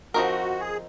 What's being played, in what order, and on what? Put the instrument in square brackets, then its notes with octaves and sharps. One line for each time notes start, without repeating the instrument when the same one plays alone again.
[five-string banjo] F3 C4 D#4 A#4 [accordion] F#4
[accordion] G#4